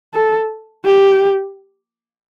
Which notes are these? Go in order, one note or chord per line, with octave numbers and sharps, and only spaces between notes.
A4
G4